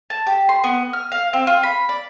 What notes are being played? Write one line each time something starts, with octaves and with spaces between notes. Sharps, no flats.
A5
G4
C6
B3
F6
F5
C4
F4
B5
D5